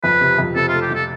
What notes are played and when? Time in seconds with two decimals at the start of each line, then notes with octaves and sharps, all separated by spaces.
0.03 F2 B4
0.21 C3
0.39 F2
0.56 C3 A4
0.68 F4
0.73 A3
0.82 G4
0.90 F2 A4